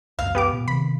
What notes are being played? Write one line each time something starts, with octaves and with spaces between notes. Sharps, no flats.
C#2 F#2 F5
B3 G4 D6
A#2
C3 D#3 B5